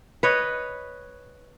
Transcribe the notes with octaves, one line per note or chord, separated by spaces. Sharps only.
B4 C#5 D#5